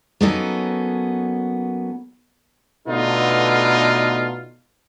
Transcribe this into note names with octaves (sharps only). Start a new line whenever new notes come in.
F#3 A#3 B3 C#4 D#4 A4
B2 D3 A3 B3 D#4 F4